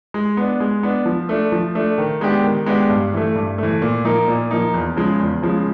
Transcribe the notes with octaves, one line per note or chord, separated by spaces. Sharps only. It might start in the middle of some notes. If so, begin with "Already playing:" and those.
G#3
B3 D4
G#3
B3 D4
F3
A3 D4
F3
A3 D4
D#3
G#3 B3 D4 G4
D#3
G#3 B3 D4 G4
G2
E3 A3
G2
E3 A3
A#2
F3 A#3 D#4
A#2
F3 A#3 D#4
E2
C#3 F3 G#3
E2
C#3 F3 G#3